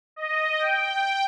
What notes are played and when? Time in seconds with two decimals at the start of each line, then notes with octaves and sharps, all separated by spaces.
0.16 D#5
0.59 G5